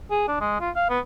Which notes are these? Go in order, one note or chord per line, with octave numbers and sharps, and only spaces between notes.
G#4
D4
G#3
F4
F5
B3